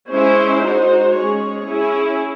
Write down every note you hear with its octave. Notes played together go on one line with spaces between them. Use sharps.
G#3 C#4 E4 C5
G#3 D#4 F#4 C5
G#3 C#4 G#4 C#5
C#4 E4 G#4